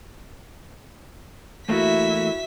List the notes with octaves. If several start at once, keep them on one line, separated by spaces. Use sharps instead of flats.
E2 A3 A#3 E4 F#4 E5 B6